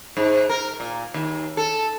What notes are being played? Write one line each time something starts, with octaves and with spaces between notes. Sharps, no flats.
G#2
A#4
A#2
D#2
A4